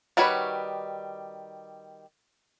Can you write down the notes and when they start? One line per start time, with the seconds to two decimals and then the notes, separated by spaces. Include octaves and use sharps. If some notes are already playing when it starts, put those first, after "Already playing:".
0.17 D#3 G3 F#4 B4 C#5